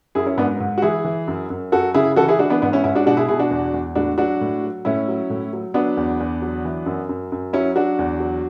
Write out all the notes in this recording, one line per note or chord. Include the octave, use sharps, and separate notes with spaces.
F#2 E4 G#4
C#4 E4
G#2 B3 D4
G#2
F#4
E3 E4 G#4
E3
F#2
F#2
F#2 F#4 A4
C#3 E4 G#4
E3 F#4 A4
E4 G#4
E3 D4 F#4
B3 D4
G#2 B3 D4
C#4 E4
G#2 C#4 E4
D4 F#4
B2 D4 F#4
E4 G#4
B2 E4 G#4
D4 F#4
E2
E2
A2 D4 F#4
F#3 D4 F#4
A2
F#3
A2 C#4 E4
F#3
A2
F#3
F#3 B3 D4
E2
E2
F#3
E3
F#2
F#2
F#2
F#3 C#4 E4
F#3 D4 F#4
E2
F#3